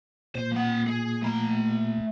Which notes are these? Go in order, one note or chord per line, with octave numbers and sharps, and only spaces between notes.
A#2 C5
A#3 F#5
G#4
A3 A#5